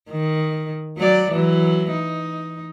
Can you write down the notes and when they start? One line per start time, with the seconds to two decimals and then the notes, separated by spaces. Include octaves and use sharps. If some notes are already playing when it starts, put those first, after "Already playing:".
0.10 D#3
0.97 F#3 D5
1.31 E3 F#3
1.91 D#4